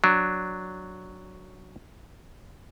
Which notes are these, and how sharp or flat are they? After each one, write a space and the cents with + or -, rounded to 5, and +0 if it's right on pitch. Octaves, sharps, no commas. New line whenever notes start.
F#3 +0 D4 +0